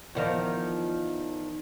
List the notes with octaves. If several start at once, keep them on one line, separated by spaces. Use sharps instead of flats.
E2 D#3 F3